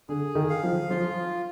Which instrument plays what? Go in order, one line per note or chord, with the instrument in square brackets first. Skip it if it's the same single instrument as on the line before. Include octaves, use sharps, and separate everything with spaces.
[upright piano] D3 [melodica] G#4
[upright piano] D#3
[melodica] F5
[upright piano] F3
[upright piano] F3 [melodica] F4